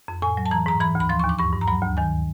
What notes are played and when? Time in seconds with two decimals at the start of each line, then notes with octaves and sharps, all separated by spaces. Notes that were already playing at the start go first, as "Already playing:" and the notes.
0.08 F2
0.22 A2 G#5
0.37 F#3
0.46 A5
0.51 E3 A#5
0.66 G#2 A#5
0.81 E3 B5
0.95 D2
1.00 B5
1.09 F3 C6
1.19 C#6
1.24 D#2
1.29 D6
1.39 G2 C#6
1.53 G2
1.61 A#5
1.68 F#3 B5
1.82 D2
1.97 D#3 G#5